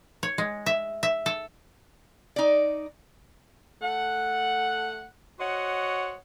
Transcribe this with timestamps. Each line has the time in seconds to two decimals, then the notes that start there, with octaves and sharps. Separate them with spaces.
0.23 C#5
0.38 G#3
0.66 E5
1.03 E5
1.26 A4
2.36 D#4 D5
3.81 A3 A4 F#5
5.40 F#4 C5 C#5 D#5 F#5